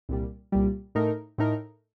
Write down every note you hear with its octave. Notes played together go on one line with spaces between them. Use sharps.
C2 A#2 G3
C2 A#2 G3
A2 A3 D#4 A#4
A2 A3 D#4 A#4